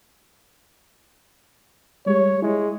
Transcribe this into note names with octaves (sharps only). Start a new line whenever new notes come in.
G3 G#3 G4 C#5
G#3 E4